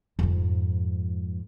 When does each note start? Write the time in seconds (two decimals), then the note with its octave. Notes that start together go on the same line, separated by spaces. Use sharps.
0.19 F2 G#2